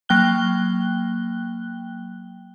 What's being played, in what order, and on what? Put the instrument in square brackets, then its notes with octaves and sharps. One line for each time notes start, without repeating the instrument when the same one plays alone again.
[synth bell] F#3 A#3 G5 F#6 G7